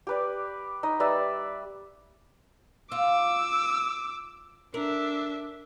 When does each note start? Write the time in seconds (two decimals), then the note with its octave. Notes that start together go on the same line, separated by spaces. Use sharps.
0.07 G4 B4 D5
0.83 D#4 D#5
1.00 G3 B4 D5 E5
2.92 F4 D6 E6
4.74 D4 A#4 E5